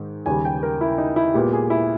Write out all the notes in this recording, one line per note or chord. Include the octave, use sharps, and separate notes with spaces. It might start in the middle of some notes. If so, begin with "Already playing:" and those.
Already playing: G#2 D#3
D#2 C#3 G3 G#5
G5
A#4
E4
D#4
E4
A#2 G#3 B3 G4
G#4
E4